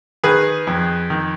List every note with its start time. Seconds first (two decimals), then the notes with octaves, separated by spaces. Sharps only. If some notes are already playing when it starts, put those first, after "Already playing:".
0.24 D#3 G#4 B4
0.67 F2
1.10 D#3